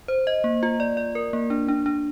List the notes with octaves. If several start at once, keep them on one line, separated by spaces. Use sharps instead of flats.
C5
D#5
A#3
F4
D5
D5
A#4
A#3
D4
D4
D4